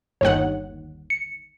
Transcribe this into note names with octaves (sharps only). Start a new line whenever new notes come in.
G1 D#2 C#5 F#5
C#7